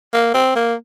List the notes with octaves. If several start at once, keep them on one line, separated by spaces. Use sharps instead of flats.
A#3
C4
A#3